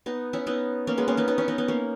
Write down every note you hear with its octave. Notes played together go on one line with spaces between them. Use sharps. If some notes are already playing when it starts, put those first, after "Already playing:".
B3 D#4
C#4 E4
B3 D#4
A#3 C#4
G#3 B3
A#3 C#4
B3 D#4
B3 D#4
C#4 E4
B3 D#4
B3 D#4
A#3 C#4